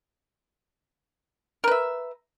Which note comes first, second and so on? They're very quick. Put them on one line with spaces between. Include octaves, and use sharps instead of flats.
A#4 B4 E5